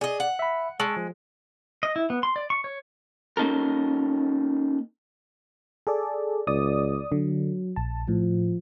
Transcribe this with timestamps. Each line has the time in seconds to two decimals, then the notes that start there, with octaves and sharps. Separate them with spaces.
0.01 G#4 D5 D#5
0.20 F#5
0.39 E5 B5
0.80 G#3 A5 C#6 E6
0.97 F3
1.83 D#5
1.96 E4
2.10 B3
2.23 C6
2.36 D5
2.50 C#6
2.64 C#5
3.37 A#3 C#4 D#4 A4 A#4
5.87 G#4 A4 D5
6.47 C#2 D5 D#6
7.12 D3 F#3
7.76 A#1 A5
8.08 A2 F3